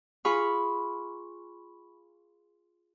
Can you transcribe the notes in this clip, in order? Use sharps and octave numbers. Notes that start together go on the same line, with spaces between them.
F4 G#4 B5 C#6